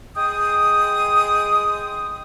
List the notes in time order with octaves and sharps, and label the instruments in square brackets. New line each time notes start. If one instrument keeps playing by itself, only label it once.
[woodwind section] G#3 G5 D#6